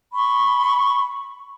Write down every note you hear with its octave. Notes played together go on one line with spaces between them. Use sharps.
B5 C#6